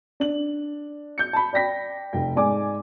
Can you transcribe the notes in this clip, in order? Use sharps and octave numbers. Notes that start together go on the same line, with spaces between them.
D4 F#7
G6 C#7
A5 B5
D5 G5 A#6 B6
F1 G5
G#2 D5 G#5 D6